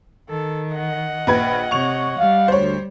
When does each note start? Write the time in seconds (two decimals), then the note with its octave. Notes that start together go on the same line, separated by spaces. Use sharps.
0.29 D#3 A4
0.72 D#5 F#5
1.27 A#1 B4 G#6
1.71 C3 C#5 C#6 F7
2.19 G3 F5
2.48 D2 C5 C#5